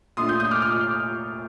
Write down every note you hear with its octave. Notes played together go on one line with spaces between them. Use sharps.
A#2 A3 D4 F4 C6 D#6
D#6 G6
D#6 G6
D6 F6
D6 F6